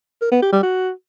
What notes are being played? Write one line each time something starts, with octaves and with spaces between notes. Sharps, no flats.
A#4
B3
G4
G3
F#4